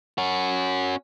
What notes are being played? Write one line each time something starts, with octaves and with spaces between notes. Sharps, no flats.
C#4 F#4